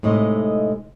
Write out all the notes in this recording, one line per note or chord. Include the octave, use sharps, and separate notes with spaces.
A2 C3 G#3 D#4 D#5